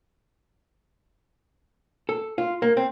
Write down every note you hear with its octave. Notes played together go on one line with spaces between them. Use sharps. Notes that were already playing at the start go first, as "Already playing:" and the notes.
A4
F4
A#3
C4